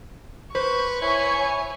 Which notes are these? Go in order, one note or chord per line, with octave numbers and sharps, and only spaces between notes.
B4 C5 C#6
E4 C#5 G#5